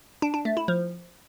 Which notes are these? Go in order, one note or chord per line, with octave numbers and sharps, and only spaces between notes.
D4
D4
A3
E4
F3